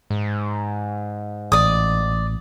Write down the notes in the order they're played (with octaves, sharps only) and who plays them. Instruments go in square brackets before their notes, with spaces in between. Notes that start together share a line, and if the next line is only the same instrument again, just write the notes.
[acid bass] G#2
[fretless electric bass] A1 [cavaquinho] D5 D#6